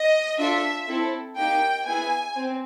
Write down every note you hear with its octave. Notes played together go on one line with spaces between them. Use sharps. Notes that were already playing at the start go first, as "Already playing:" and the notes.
Already playing: D#5
D4 F4 A4 E5
C4 E4 A4
A#3 D#4 G4 G5
B3 E4 G#4 G#5
C4